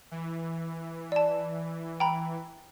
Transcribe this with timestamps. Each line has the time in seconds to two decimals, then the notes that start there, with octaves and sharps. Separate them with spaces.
0.11 E3
1.12 D5 A5
2.00 G5 A#5 B5